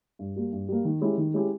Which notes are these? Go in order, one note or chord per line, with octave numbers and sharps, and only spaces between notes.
G2
G3 A#3
G2
G3 A#3
D#3
G#3 C#4 E4 G4
D#3
G#3 C#4 E4 G4